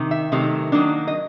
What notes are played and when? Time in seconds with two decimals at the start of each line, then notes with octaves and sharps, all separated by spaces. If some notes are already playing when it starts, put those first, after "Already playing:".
Already playing: C3 D#3
0.11 E5
0.32 C3 D#3 F#3 A3
0.72 D#3 F#3 A#3 D4
1.07 D#5